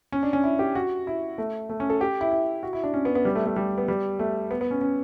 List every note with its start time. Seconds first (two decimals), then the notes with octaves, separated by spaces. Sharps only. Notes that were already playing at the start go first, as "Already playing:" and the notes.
0.12 C#4
0.23 D4
0.33 C#4
0.44 E4
0.59 G4
0.75 F#4
1.07 E4
1.38 A3
1.69 A3
1.80 C#4
1.90 A4
2.01 G4
2.21 E4
2.31 E4
2.63 F#4
2.73 E4
2.84 D4
2.94 C#4
3.05 B3
3.15 B3
3.25 G3
3.35 A3
3.46 A3
3.56 G3
3.78 B3
3.88 G3
4.19 A3
4.51 B3
4.61 B3
4.71 C#4
4.81 C#4